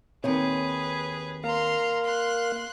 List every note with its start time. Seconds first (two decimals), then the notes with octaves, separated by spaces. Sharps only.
0.24 D#2 C4 G#4 B4 C#5
1.44 A#3 F5 A#5 C6
2.04 C6 F#6